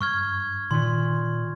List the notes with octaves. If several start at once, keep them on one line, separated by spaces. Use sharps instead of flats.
G2 C#6 F6 G#6
A#2 D#3 C6